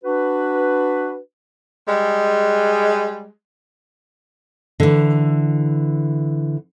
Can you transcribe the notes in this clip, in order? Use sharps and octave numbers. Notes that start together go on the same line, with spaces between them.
D4 F#4 B4
G3 G#3
D3 E3